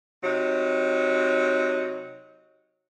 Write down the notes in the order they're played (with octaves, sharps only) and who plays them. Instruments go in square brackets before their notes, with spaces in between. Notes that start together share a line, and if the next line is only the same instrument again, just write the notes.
[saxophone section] C3 F#3 D#4